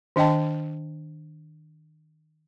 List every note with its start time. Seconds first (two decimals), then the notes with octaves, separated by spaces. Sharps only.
0.16 D#3 D4 D#5 G5 A5